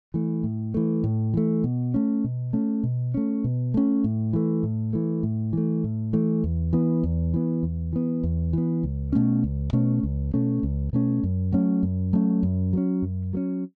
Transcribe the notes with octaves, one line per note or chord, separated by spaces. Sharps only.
E3 A3
A2
E3 A3
A2
E3 A3
B2
A3 C#4
B2
A3 C#4
B2
A3 C#4
B2
A3 C#4
A2
E3 A3
A2
E3 A3
A2
E3 A3
A2
E3 A3
E2
E3 B3
E2
E3 B3
E2
E3 B3
E2
E3 B3
C#2
B2 A3 C#4
C#2
B2 A3 C#4
C#2
B2 A3 C#4
C#2
B2 A3 C#4
F#2
F#3 A3 C#4
F#2
F#3 A3 C#4
F#2
F#3 A3 C#4
F#2
F#3 A3 C#4